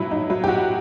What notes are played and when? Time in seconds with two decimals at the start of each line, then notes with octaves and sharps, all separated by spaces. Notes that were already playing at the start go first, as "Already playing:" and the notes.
Already playing: G2 F#3 E4 G4
0.11 D#4
0.30 F#3 E4
0.44 G4
0.48 F#4